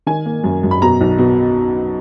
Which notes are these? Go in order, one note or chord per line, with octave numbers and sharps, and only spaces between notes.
D#3 G#5
A#3
F#2
F#2
B5
B2 A#5
B1
B2